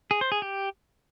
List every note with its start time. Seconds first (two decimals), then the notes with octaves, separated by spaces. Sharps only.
0.11 G#4
0.21 C5
0.32 G#4
0.42 G4